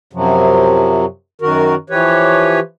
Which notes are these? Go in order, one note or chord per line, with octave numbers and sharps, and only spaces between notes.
F#2 C3 F3 F#3
F#2 D#3 F#4 A#4
E3 F3 G4 B4 C#5